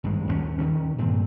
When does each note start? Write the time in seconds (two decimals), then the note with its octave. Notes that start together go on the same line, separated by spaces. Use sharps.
0.04 G#1 G2 G#3
0.27 D#2 G3 C#4
0.58 D#3 E3 C#4
0.98 G2 A#2 C4